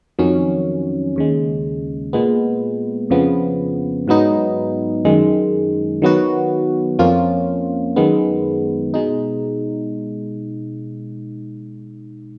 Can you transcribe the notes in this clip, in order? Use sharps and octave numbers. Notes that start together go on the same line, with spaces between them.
F2 D#3 F#3 C#4
D#2 C#3 G#3
A#2 G#3 B3
F2 C#3 F3 B3
G#2 F#3 B3 D#4
F#2 D#3 G#3
D#3 F#3 B3 F#4
F2 F3 A#3 C#4 F4
F#2 D#3 G#3 B3
B2 G#3 D#4